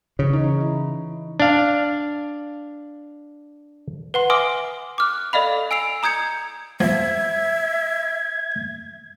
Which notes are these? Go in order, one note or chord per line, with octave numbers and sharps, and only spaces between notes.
C#3 E3 C#5
D#4
E4
D4 F5
B4 F#5 C6
E5 G#5 C6 D6 D#6 F6
D6 F6 F#6
A4 D5 D#5 F5 B5
G#5 E6 C7 F7
A#5 D#6 G6 G#6 C#7
F3 E5 G#6